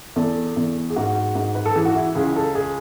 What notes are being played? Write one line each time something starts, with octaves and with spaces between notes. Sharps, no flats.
E2 A4
E2
G#4
G#2 F#4
G#2
B4
A4
E3 G#4
F#4
E4
C#2 G#4
A4
G#4